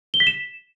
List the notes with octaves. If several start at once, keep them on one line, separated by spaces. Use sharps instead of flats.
G7
B6
E7